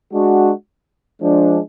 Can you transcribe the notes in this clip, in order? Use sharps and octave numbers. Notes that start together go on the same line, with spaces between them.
G#3 D4 F#4
F3 G#3 D4